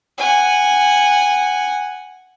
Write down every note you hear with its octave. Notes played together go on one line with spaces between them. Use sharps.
F#5 G#5